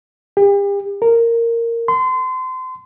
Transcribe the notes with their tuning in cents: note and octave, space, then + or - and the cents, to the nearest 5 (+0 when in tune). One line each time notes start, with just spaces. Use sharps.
G4 +40
A#4 -10
C6 -30